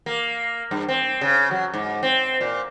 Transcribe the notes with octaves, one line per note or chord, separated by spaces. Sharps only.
A#3
G2
C4
C#3
F#3
G#2
C4
A#2